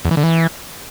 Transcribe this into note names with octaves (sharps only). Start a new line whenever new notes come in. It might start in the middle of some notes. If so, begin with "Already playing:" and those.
E2
E3
D3
E3